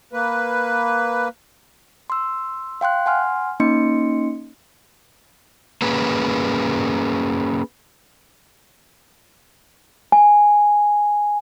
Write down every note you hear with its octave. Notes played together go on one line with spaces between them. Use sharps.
A#3 B4
C6 E6
F5 G5 C6 F#6
F#5 G#5 C6 F6
A#3 C#4 D#4 D#5 C6 C#7
A#3 C#4 G#4 B4
G#5